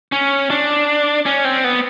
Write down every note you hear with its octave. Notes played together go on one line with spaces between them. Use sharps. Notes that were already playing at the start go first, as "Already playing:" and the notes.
C#4
D4
C#4
C4
B3